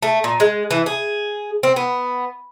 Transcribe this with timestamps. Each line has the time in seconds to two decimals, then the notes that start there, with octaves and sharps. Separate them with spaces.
0.03 A3
0.24 A#2
0.40 G#3
0.71 E3
0.86 G#4
1.63 C4
1.76 B3